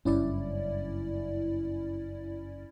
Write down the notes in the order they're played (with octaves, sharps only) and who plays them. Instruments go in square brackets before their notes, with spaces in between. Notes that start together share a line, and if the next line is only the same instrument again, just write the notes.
[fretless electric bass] F#1 G2 [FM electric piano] C#4 E4 D5